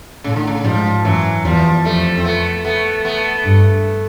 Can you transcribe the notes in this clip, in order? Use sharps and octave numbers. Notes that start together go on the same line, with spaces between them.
A2 C#3
D3
C#3
G#2 F3 G3
F#2 E3 F#3
E2 F3 G3
F2 G3 A3
C4
A3 B3
A3 B3
A3 B3
G2